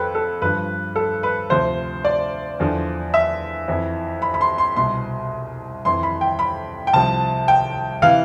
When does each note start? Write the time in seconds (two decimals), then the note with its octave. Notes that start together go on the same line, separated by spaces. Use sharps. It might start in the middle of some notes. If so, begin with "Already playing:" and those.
Already playing: F2 F3 A4 B4 G5
0.15 A4
0.42 G2 F3 B4
0.96 A4
1.23 B4
1.50 D2 C3 F3 C5
2.05 D5
2.60 E2 D3 F3
3.14 E5
3.68 F2 E3
4.22 B5
4.34 B5
4.41 C6
4.58 C6
4.76 C2 B2 C6
5.85 F2 E3 C6
6.03 B5
6.21 G5
6.39 B5
6.87 G5
6.94 C2 C3 F3 A5
7.48 G5
8.02 C3 E3 F5